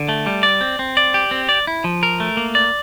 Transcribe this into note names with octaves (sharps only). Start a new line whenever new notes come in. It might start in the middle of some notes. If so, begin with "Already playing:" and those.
Already playing: D3
A3
G3
D5
C4
C4
D5
G4
C4
D5
E4
F3
A#4
A3
A#3
D5